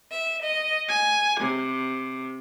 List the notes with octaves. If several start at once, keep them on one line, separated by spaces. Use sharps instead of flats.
E5
D#5
G#5
C3